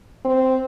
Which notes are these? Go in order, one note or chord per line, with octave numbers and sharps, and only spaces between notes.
C4